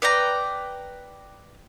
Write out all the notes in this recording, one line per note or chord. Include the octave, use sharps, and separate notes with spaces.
B4 D5 G5 A#5